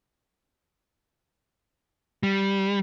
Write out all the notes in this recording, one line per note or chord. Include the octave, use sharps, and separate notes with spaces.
G3